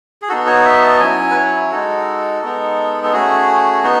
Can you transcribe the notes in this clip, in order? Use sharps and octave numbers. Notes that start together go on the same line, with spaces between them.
G#4
B3 D#4 F#4 A4
C#5
E5
A5
F#3 C#4 E4 G#5
B4
C#5
G#3 D#4 F#4 A4
G#3 B3 D#4
A4
A3 C#4 F#4 G#4
B3 D#4 F#4